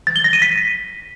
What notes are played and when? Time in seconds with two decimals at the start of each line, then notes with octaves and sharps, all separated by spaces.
0.07 A6
0.16 G7
0.24 A#6
0.33 D#7
0.42 B6